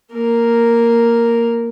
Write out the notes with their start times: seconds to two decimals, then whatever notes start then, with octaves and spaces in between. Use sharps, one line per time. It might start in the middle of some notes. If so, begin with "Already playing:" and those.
0.13 A#3 A#4